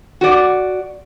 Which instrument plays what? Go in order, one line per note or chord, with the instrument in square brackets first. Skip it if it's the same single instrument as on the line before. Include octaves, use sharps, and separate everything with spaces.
[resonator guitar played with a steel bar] F#4 D5